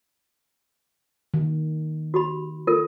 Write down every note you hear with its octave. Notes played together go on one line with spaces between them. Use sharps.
D#3
F#4 G4 B5
F4 A4 A#4